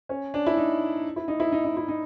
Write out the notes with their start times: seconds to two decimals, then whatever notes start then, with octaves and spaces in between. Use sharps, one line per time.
0.09 C#4
0.34 D4
0.46 E4
0.57 D#4
1.16 E4
1.28 D#4
1.40 E4
1.52 D#4
1.65 D#4
1.77 E4
1.88 D#4